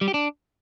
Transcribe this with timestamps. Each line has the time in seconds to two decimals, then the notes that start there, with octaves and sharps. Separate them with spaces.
0.01 G3
0.08 G4
0.14 D4